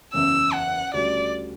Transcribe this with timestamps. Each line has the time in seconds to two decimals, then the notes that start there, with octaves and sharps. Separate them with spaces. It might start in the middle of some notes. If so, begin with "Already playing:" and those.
0.13 F#1 E2 C#3 E6
0.53 F#5
0.94 D2 C#3 G3 D5